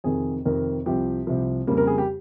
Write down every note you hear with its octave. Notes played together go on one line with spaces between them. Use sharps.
F2 C3 D#3 G#4
F2 C3 D#3 A#4
C2 C3 F3 G4
C2 C3 F3
F2 C#3 G3 A#3
A#4
G#4
G4